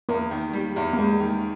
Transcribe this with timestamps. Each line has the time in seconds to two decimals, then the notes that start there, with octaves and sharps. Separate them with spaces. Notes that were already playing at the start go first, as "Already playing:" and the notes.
0.09 E2 A#3
0.31 D#3
0.53 G3
0.76 E2
0.93 A#3
0.98 E2 G#3
1.20 D#3